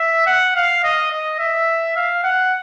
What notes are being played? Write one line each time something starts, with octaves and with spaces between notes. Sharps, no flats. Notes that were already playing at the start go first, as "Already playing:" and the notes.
Already playing: E5
F#5
F5
D#5
D#5
E5
F5
F#5